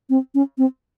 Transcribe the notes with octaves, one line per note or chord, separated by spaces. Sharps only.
C4
C#4
C4